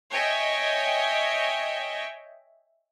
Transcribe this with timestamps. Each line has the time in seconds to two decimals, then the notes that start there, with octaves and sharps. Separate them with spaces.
0.12 C#5 D#5 E5 G5 G#5